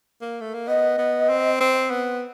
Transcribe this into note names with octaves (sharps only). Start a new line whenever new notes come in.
A#3
A3
A#3
B3 D#5
B3
C4
C4
B3